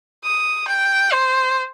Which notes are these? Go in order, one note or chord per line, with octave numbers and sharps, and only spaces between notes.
D#6
G5
C5